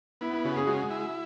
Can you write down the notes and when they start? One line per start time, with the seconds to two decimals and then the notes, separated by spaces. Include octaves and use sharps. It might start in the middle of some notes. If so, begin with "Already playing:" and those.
0.21 B3 E4
0.33 E4
0.44 C#3 F#4
0.56 G#4
0.67 G#3 F#4
0.90 E4